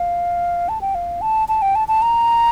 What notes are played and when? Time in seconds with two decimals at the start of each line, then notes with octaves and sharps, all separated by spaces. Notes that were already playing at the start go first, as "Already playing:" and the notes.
Already playing: F5
0.69 A5
0.81 G5
0.95 F5
1.21 A5
1.48 A5
1.62 G5
1.75 A5
1.88 A5
2.02 A#5